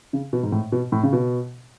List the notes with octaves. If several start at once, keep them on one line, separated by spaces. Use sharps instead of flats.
C#3
B2
G#2
A2
B2
A2
C#3
B2